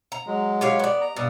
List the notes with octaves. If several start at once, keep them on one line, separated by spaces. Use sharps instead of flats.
A#5
F#3 G#3
G4 C#5 F5
B3 D5
A#5
G2 B2 D5 D#6